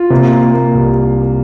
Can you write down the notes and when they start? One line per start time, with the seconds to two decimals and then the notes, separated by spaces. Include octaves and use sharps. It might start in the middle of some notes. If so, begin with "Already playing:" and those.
Already playing: F4
0.10 C3 A#3
0.32 A#3
0.53 A#3
0.74 C2